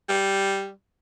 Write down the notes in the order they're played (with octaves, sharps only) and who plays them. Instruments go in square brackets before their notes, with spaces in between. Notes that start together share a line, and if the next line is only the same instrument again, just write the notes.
[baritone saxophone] G3